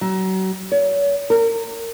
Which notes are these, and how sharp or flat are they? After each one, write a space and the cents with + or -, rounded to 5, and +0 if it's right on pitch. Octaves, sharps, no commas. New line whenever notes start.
F#3 +35
C#5 +35
A#4 -25